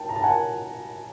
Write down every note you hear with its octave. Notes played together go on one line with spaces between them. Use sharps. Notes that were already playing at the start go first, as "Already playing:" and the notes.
Already playing: G5 A5
A#5
A5
F#5 G#5